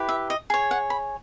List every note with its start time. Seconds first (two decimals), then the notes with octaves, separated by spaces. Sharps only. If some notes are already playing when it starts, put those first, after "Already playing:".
Already playing: E4 G4 B4
0.09 E5
0.30 D#5
0.50 G#4 C#5
0.71 F#5
0.90 B5